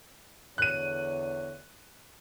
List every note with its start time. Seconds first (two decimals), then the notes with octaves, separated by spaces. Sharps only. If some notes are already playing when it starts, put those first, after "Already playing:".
0.58 E2 D3 C#5 F#6 D#7